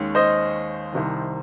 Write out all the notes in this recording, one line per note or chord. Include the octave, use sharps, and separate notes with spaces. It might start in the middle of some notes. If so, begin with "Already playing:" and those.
Already playing: D#2 D#3 G#3 C#4
C5 D#5
C2 C3 D#3